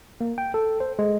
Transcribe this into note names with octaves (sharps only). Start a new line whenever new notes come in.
A#3
G5
A4
C5
G#3